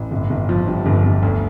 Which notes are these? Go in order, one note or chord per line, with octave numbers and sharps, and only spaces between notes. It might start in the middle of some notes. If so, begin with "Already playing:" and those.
Already playing: A1
G1
G1
F3
G2
G1
G1
D2